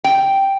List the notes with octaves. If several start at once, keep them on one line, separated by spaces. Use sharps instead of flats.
G5